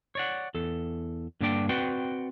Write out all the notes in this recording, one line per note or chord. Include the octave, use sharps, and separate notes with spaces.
C#5 D5 F#5
E2 A4
G2 D3 A#3 D4 D5 G5
C4 F#4 B4 D5 F#5 G5